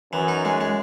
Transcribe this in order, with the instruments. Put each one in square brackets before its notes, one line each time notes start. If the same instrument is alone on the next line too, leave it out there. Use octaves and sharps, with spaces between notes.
[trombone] F#2 [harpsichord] E3
[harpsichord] D#4
G#3
G#3